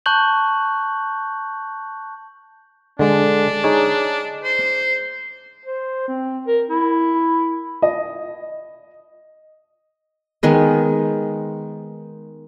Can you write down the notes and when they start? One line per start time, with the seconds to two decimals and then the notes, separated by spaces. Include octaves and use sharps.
0.06 A5 C#6 F#6 G6 F#7
2.99 D3 G#3 D4
3.64 D#4 G#4 C#5
4.44 C5
5.65 C5
6.08 C4
6.47 A#4
6.70 E4
7.82 D#5
10.43 D#3 G#3 B3